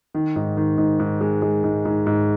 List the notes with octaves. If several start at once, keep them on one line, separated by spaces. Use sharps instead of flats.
D#3
G#2
D#3
G#2
G#2
G#3
G#3
G#2
G#2
G#2